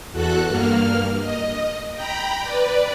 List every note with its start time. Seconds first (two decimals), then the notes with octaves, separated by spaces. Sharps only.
0.12 E2 F#4 A4 F#6
0.49 G2 A#3 F6
1.20 D#5
1.94 G5 A#5 B5
2.41 B4 D5